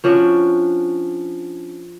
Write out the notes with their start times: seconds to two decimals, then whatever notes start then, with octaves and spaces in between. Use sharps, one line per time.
0.04 F3 C#4 D4 F#4